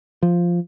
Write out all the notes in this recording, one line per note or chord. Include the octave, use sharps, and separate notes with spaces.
F3